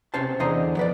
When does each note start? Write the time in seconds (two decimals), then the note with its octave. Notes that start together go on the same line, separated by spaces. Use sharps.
0.14 C3 C#4 C5 A5
0.40 E2 D3 C5 D#5 A#5
0.77 F3 B4 D5